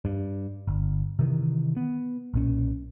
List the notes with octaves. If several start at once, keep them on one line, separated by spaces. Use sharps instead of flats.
G2
G1
C3 D#3 E3
B3
B1 A#2 C#4